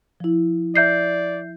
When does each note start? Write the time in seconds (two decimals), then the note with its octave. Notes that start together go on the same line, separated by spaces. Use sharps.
0.20 F3 E4
0.75 D5 E5 G6 C7